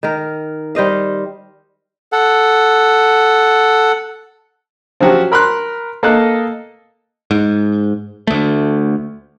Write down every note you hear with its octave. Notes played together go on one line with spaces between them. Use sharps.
D#3 A#4
G3 C5 D#5 F5
A4 F#5
F3 F#3 C#4 F#4 G4
A#4 B5 C6 F#6
A#3 A4 D#5 A5 F#6
G#2
D2 A3